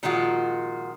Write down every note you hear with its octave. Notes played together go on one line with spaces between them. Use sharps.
A#2 D#3 F3 G#3 F4 F#4